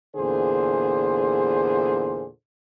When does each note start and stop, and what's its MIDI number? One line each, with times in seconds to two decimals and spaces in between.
0.16 2.26 40
0.16 2.26 46
0.16 2.26 50
0.16 2.26 68
0.16 2.26 72